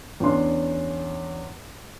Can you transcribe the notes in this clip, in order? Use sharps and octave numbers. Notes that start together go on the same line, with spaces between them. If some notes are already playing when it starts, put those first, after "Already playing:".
E2 C#4 D4 C6